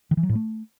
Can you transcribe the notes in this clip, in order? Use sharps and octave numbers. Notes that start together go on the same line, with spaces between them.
D#3
E3
F#3
A2
A3